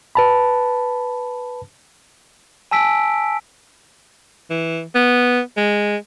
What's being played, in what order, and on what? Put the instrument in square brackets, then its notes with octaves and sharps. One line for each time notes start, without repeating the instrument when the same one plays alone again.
[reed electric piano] B4 A5 B5
[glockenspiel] G#5 A5 E6 B6 D7
[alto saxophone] E3
B3
G#3